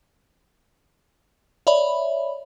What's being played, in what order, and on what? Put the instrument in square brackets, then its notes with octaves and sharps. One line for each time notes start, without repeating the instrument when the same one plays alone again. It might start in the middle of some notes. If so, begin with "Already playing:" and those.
[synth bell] C#5 D5 E5 B5